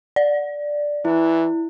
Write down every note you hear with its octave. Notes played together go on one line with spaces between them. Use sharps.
D5
E3 E4